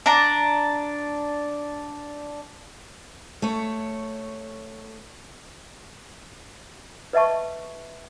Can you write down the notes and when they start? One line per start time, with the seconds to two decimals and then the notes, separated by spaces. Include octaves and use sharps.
0.06 D4 A#5
3.42 A3 C#5
7.13 B4 D#5 E5 A5 C#6